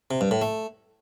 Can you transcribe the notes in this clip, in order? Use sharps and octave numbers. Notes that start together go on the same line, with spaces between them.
C3
G2
A2
A3